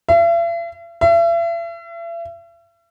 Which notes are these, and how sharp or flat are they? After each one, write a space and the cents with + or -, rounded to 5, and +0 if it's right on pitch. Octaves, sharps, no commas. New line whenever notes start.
E5 +45
E5 +40